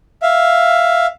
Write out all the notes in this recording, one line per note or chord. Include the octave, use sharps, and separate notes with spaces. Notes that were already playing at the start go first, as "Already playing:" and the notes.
E5 F5